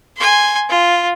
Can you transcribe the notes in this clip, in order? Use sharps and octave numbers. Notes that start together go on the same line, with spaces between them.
G#5 C6
F4